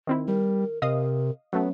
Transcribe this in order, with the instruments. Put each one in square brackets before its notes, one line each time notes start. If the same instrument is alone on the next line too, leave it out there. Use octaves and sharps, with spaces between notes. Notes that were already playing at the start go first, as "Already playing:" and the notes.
[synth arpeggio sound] D#3 C4 E4
[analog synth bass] G3 [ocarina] A#4
[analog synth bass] C3 [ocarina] A#4 [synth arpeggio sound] D#5 F5 D#6
[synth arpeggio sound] F#3 A3 [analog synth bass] B3 [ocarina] C#4